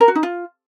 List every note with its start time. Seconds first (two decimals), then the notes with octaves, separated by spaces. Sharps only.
0.01 A#4
0.08 F#4
0.16 D#4
0.23 F4